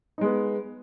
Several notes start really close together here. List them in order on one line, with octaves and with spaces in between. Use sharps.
D#4 G#3 B3